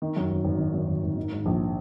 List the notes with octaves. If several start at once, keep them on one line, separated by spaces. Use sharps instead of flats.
D#3
F#2
G#1
G#1
D#3
F#2
G#1
G#1
D#3
G#2
A#1